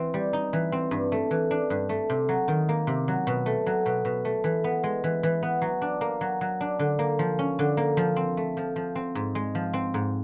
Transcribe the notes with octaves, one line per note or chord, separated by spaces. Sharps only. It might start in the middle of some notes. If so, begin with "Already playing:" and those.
Already playing: E3 C4
G3
D#4
E3
C4
G2
A3
E3
D4
G2
A3
C3
F#3
D#3
A#3
C3
F#3
B2
A3
F#3
B2
B2
A3
E3
B3
G#3
E3
E3
B3
F#3
D4
A#3
F#3
F#3
D4
D3
A#3
F3
C#4
D3
A#3
F3
C4
A3
F3
F3
C4
G#2
G#3
F3
C4
G#2